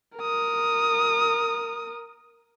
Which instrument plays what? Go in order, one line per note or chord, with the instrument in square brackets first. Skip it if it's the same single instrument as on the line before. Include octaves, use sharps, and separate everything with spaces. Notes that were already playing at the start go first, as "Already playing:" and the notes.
[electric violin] A#4 D#6